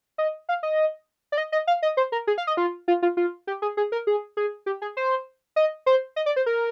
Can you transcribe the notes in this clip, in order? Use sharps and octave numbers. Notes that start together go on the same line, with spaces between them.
D#5
F5
D#5
D5
D#5
D#5
F5
D#5
C5
A#4
G#4
F5
D#5
F4
F4
F4
F4
G4
G#4
G#4
A#4
G#4
G#4
G4
G#4
C5
D#5
C5
D#5
D5
C5
A#4